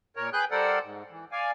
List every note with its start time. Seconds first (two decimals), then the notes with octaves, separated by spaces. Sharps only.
0.16 A#2 A#4 C#5
0.33 G#4 B4 G5 F#6 G6
0.51 G3 A4 A#4 C5 D5 F#5
0.83 G#2
1.10 E3
1.32 D5 F5 G#5